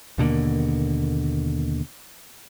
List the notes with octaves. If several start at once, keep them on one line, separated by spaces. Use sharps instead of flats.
D#2 B2 D3 A#3